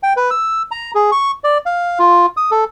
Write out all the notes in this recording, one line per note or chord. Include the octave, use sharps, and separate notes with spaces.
G5
B4
E6
A#5
G#4
C#6
D5
F5
F4
D#6
A4